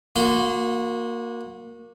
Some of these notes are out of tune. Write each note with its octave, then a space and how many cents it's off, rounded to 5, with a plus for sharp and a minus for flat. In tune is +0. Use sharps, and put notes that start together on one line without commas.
A#3 +0 F#4 -30 C6 -35